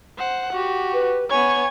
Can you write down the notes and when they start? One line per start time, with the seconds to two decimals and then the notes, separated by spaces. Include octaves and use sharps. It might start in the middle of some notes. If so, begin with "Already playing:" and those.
0.18 C5 F#5
0.53 F#4 G4
0.92 B4
1.30 B3 C#5 G#5 G#6